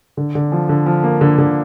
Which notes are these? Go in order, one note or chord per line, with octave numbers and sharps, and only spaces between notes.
D3
D3
F3
D3
F3
A#3
D3
D3